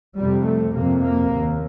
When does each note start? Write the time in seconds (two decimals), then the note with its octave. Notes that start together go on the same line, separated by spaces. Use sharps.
0.18 F2 C3 G3
0.47 A3
0.76 F2 C3 A#3
1.04 A#3
1.33 D#2